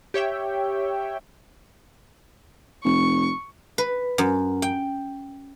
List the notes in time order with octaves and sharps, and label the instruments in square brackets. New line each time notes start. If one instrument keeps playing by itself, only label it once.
[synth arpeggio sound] G4 C#5 E5 G5
[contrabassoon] F1 [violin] C#6
[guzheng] B4
F#2
G5